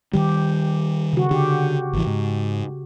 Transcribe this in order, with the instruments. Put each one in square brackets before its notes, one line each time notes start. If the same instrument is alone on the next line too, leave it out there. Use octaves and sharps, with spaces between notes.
[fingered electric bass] D#3 G3 [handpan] G4
[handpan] C#3 F#4
[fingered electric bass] D3 [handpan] G4
[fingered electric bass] G#1 E3
G#2